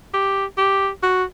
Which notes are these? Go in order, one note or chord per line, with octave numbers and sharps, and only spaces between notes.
G4
G4
F#4